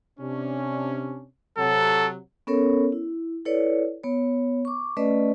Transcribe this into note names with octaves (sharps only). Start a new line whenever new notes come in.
C3 C#4 D4
C3 F#3 A4
B3 C#4 A4 A#4 C#5
E4
E4 A4 B4 C#5 D5
B3 C#5
C#6 D6
A3 C#4 B4 D5 D#5